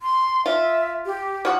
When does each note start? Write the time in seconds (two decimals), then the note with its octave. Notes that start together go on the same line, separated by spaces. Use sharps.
0.02 C6
0.46 F4 E5
1.06 G4
1.45 F3 F#4